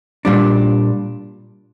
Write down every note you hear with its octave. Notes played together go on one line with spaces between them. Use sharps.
A#2 G3 D4